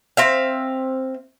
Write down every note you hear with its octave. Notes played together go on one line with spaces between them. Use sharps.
C4 E5 F5